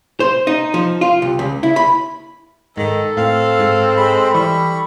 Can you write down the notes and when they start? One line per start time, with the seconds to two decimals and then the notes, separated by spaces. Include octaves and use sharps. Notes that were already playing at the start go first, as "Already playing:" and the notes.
0.20 C5
0.47 D#4
0.74 F3
1.01 F4
1.22 C2
1.39 C#2
1.63 E4
1.76 B5
2.77 G#2 D#3 A4
3.17 A2 C4 F5
3.59 G#2
3.97 G#3 B5
4.34 E3 G3 B5 C#6